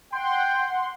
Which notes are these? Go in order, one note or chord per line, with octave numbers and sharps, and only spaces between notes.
F#5 G5 C6